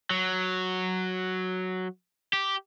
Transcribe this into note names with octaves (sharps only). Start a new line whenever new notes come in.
F#3
G4